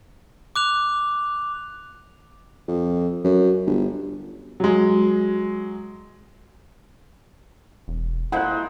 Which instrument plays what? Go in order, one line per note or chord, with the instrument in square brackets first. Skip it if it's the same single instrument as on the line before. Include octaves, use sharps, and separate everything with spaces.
[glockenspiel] D6 F#6 F7
[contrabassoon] F2
F#2
G1
[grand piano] F#3 G#3
[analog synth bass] E1
[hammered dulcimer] A#2 G#3 C5 [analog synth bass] E4 [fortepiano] F#5 F#6